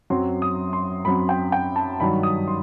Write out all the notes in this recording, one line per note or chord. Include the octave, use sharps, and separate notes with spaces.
F#2 F#3 C4 C6
D#6
C6
F#2 F#3 C4 B5
G5
G5
A5
G2 D#3 F#3 B5
D#6
C6